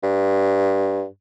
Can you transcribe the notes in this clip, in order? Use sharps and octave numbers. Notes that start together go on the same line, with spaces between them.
G2